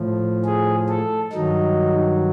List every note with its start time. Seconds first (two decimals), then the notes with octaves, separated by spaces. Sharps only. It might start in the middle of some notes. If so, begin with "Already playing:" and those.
Already playing: A2 F3
0.44 G#4
0.89 A4
1.32 G2 D#3 F#3 D#4